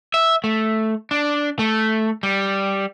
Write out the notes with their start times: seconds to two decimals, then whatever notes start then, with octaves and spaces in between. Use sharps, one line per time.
0.14 E5
0.44 A3
1.11 D4
1.59 A3
2.23 G3